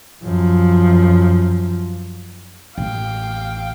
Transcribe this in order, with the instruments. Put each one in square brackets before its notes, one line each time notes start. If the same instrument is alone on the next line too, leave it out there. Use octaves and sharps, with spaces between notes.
[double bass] F#2 F3
[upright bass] A1 [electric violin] F5 G5